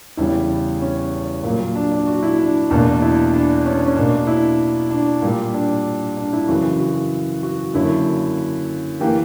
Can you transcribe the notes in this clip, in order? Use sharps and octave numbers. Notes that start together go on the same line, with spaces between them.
E2 C#3 G3 E4
C#4
A#2 F#3 A#3
D4
D4
F#4
E4
D4
E2 B2 A#3 D4
E4
D4
C#4
C#4
B2 A#3 D4
E4
D4
A#2 G3 A#3
D4
D4
E4
F#2 C#3 E3 F#4
F#4
F#4
F#2 D3 F#3 A#3 E4
E3 A#3 G4